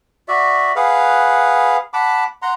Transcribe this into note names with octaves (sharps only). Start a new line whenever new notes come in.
F#4 D5 E5
G#4 B4 F5 F#5
F#5 A5 B5 D6
F#5 A#5 C6